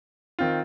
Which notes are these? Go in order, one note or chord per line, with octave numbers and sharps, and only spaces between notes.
D#3 C4 F4